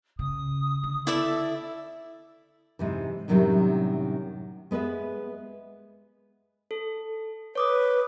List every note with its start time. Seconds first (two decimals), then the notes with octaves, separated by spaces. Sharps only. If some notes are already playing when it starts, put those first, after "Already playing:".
0.19 C#3 D#6
0.83 D3
1.07 E4 A4 D5 E5
2.79 G#2 C3 E3
3.28 F#2 A2 C3 D#3 F#3 G3
4.71 G#3 B3 G#4 B4 E5
6.71 A4
7.55 B4 C#5 D6 D#6